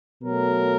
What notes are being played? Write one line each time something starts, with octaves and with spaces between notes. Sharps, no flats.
B2 F#3 A3 A#4